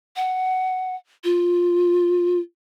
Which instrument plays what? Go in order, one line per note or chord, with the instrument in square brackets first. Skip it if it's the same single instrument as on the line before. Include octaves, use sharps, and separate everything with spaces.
[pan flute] F#5
F4